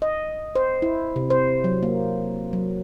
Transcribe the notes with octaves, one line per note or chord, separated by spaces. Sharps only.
D#5
C5
E4
C3
C5
F#3
A#3
F#3